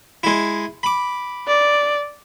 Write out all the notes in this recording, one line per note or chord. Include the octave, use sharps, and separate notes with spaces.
G#3 E4
B5 D6
D5